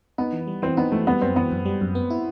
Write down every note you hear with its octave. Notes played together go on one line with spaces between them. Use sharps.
B3 D#4
E3
G3
E3 C4
B3 D#4
E3 A3
G3 B3
F#2 C4
E3 B3
F#2
G3
F#2
B3
E4